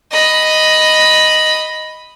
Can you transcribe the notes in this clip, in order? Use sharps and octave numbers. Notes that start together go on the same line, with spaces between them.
D#5 B5